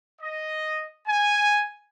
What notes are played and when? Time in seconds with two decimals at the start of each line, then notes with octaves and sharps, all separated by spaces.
0.21 D#5
1.08 G#5